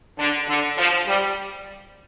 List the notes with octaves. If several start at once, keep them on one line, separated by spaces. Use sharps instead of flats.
D3
D3
F3
G3